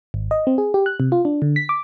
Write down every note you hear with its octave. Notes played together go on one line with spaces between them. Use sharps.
G#1
D#5
C4
G#4
G4
F#6
C3
F4
D4
D3
B6
D6